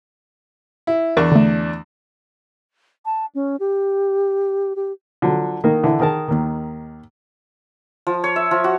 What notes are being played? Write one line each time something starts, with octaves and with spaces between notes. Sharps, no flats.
E4
E2 D4 A#4 C#6
D3 A3
A5
C#4
G4
G4
D3 F3 F#3
D#3 A#3 D#4 A#4
D3 E3 E4
D#3 G#4 A#4 A5
D#2 D#3
F3
C#5
E5
F3
F#4